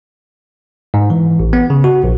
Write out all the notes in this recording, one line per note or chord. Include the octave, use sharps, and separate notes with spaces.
G#2
E3
A1
B3
C#3
F#4
A#1